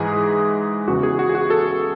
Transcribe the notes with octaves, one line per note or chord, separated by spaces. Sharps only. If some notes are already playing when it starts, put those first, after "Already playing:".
Already playing: G#2 E3 G#3 G#4
E2 C#3 E3 F#4
G#4
F#4
G#4
F#4
A4